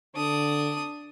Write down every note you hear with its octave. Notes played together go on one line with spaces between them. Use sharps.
D3 D4 D#6